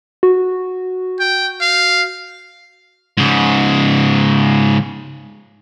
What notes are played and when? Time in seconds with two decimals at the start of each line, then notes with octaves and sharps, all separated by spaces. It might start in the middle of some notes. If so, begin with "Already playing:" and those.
0.23 F#4
1.20 G5
1.61 F5
3.18 G#2 C#3